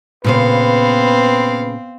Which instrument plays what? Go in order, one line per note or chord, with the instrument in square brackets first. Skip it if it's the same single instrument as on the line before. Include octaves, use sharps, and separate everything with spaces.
[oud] A#2 C#3 C5 [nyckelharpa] B3 F5 [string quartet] C4 [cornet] B4